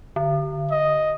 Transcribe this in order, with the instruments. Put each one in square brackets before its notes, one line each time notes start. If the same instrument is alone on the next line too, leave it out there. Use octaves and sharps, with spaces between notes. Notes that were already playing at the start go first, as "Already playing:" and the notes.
[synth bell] D3
[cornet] D#5